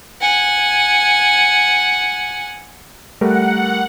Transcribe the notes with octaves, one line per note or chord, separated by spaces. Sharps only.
F#5 G#5
G3 A3 A#4 F#5